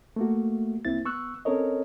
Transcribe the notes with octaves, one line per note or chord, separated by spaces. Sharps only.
A3 A#3 F#4
C2 A#3 C4 E4 A6
B3 C#6 E6 F#6
C4 C#4 A4 A#4 C#5 D#5